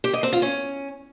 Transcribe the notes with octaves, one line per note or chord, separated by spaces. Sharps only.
G4
D#5
C4
F4
C#4